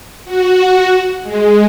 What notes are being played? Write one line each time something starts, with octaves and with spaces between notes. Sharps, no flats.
F#4
G#3